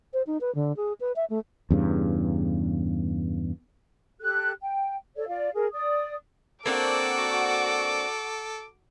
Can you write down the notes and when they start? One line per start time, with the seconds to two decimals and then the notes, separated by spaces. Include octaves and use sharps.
0.13 C5
0.27 D#4
0.41 B4
0.55 D3
0.76 G#4
1.00 B4
1.16 E5
1.30 A3
1.70 E2 G2 C#3
4.20 G4 A4 F#6
4.62 G5
5.16 A4 C#5 D5
5.28 F4 D5 F5
5.54 G#4 A#4
5.73 D5 D#6
6.66 A#3 C4 D4 F#4 A4 F#5 D6